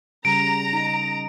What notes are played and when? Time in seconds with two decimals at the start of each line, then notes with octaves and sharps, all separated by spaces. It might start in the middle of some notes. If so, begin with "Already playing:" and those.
0.25 C#3 G3 A#5 D7
0.73 D#4